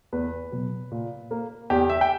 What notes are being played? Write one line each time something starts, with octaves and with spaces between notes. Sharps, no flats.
E2 B4
B2 F#3
A#2
A#3
E2 G4
E5
G5